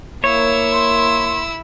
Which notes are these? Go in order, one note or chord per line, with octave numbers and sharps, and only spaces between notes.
A#3 E4 C#5 E6
C6